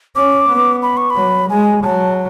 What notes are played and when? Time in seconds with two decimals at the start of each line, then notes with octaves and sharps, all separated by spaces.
0.16 C#4 D6
0.50 B3
0.82 B5
0.97 C#6
1.10 B5
1.16 F#3
1.50 G#3 G#5
1.83 F#3 A5